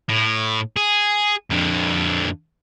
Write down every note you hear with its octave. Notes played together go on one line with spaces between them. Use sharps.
A2
G#4
F2 D3